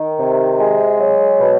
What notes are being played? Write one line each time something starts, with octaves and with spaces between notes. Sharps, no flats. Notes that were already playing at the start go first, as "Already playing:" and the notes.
Already playing: D#3
C3
G#3
F#3
B2